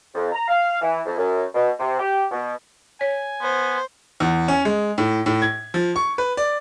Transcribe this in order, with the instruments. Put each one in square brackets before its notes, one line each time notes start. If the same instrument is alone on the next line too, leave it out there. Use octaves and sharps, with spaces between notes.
[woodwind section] F2
A#5
F5
E3
F2
F#2
B2
C3
G4
B2
[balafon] C#5 [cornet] G#5
[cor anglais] B3 [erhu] C5
[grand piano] E2
C#4
G#3
A2
A2
G#6
F3
C#6
B4
D5